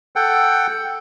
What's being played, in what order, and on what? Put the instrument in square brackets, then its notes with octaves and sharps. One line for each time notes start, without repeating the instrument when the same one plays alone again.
[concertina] A4 F#5 G5